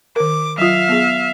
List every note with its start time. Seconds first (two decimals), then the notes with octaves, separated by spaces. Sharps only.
0.16 D#3 A#4 D6
0.58 F#3 F4 E5 F5
0.89 B3 G#4